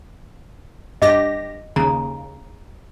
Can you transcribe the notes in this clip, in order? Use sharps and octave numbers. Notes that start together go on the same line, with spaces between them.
G2 G4 D#5 A#6
D#2 C#3 A#5